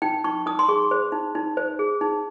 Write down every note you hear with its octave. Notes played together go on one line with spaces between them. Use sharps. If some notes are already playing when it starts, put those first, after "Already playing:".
D#4 G5
D#4 C#6
D#4 D#6
C6
G#4 C#6
C5
D#4
D#4
C5
G#4
D#4